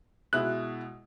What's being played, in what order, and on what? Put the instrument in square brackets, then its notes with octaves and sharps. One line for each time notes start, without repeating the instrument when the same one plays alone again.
[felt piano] B2 G#3 E4 [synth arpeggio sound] F#6